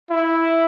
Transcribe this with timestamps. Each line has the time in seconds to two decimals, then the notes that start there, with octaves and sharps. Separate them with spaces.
0.10 E4